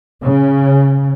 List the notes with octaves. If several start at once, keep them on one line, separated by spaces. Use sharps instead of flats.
C#3